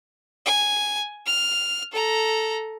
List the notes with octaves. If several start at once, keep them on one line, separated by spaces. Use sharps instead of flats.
G#5
F6
A4 A#5